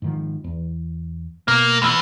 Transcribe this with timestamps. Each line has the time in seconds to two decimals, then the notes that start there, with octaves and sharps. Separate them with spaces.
0.02 G#2 D#3 F3
0.44 E2
1.48 B2 A#3
1.82 E2 E3